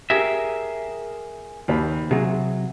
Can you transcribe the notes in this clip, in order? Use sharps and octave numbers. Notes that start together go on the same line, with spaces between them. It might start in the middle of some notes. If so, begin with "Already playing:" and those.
G4 G#4 A#4 E5
D#2 C5 B5
C3 F#3 G#4